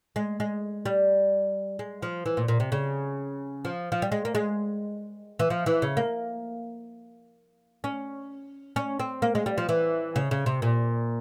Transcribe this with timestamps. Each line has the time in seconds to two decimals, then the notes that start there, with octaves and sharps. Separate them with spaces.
0.16 G#3
0.40 G#3
0.85 G3
1.79 G#3
2.02 F3
2.26 E3
2.37 A#2
2.48 A#2
2.60 C3
2.72 C#3
3.65 F3
3.92 F3
4.02 G3
4.12 G#3
4.25 A#3
4.35 G#3
5.39 E3
5.50 F3
5.66 E3
5.82 C#3
5.97 A#3
7.84 C#4
8.76 C#4
9.00 C4
9.22 A#3
9.35 G#3
9.46 G3
9.58 F3
9.69 E3
10.16 C#3
10.31 C#3
10.46 C3
10.62 A#2